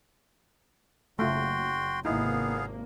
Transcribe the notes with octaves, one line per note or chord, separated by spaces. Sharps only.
F#1 A3 F4 F#4 G5 C6
G#1 C3 A#3 B3 D#4 E4 G#4 F5